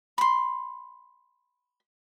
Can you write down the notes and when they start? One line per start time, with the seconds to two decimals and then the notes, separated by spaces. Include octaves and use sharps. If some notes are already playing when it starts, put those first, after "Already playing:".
0.18 B5 C6